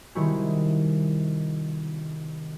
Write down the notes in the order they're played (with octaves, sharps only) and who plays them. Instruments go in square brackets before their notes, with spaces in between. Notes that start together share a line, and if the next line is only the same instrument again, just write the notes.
[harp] C3 D#3 G3 G#3 E4 F#4